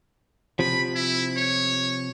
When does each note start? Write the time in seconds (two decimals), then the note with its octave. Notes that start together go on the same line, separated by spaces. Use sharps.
0.59 C3 F3 B5
0.95 E4
1.37 C#5